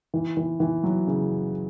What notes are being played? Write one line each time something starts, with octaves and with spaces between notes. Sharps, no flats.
E3
E3
E3
F#3
C#3